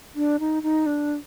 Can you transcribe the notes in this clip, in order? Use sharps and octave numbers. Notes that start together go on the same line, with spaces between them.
D4
D#4
D#4
D4